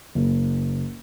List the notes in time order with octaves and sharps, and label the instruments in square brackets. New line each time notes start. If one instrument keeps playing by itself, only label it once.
[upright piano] F#1